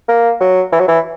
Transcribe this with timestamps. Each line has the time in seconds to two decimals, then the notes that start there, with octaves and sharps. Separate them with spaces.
0.09 A#3
0.40 F#3
0.72 E3
0.80 F#3
0.88 E3